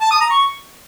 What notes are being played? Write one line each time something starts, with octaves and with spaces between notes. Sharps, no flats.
A5
D#6
A#5
C#6